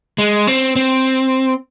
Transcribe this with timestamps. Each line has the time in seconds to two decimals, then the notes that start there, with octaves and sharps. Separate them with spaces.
0.18 G#3
0.47 C4
0.76 C4